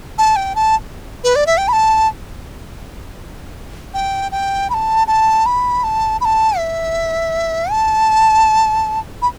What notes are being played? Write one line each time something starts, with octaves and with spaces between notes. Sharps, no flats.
A5
G5
A5
B4
D5
E5
G5
B5
A5
G5
G5
B5
A5
A5
B5
A5
B5
A5
E5
A5
B5